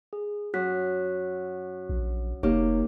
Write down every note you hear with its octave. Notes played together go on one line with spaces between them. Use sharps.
G#4
F#2 F#4 F#6 B6
A#1
F1 A#3 D#4 G4 C#5